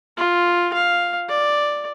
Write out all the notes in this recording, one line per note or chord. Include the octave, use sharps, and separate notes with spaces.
F4
F5
D5